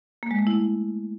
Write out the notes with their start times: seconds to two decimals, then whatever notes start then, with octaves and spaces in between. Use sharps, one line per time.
0.23 A#3
0.31 G#3
0.39 A3
0.47 E4